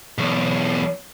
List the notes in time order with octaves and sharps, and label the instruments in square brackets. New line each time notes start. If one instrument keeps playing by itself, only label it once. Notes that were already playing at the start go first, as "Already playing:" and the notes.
[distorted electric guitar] B1 E2